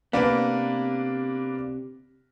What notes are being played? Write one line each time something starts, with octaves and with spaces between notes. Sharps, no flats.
C3 A#3 B3 D4 B4